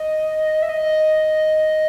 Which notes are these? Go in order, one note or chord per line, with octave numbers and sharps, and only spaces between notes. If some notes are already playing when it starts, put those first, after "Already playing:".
Already playing: D#5
E5
D#5